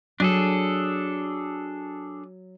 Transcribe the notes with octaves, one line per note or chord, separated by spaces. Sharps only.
F#3 D4 G#4 A4